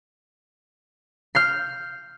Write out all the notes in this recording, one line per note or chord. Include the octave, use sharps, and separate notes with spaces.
F6 G6 C7